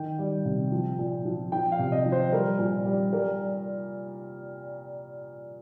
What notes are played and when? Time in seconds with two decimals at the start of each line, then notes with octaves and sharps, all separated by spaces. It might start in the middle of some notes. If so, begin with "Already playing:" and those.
Already playing: D#3 G5
0.18 G3
0.45 C3
0.72 F3
0.99 A#2
1.25 F3
1.52 F3 G5
1.72 F5
1.79 C3
1.92 D#5
2.06 F3
2.12 C5
2.32 G3 A#4
2.59 A#2
2.85 G3
3.13 G3 A#4